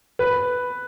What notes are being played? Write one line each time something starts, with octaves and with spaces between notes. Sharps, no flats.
B4